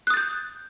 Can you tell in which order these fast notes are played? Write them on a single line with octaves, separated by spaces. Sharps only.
F#6 D#6 A6 G6